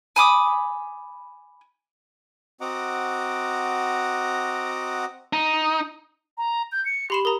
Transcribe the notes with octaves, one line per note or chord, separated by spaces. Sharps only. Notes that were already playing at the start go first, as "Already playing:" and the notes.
G#5 B5 D6 D#6
C4 F#4 D#5 F#5 A#5 D6
D#4
A#5
G6
C#7
G4 B5 C6 E7
A#4 A#5 D#6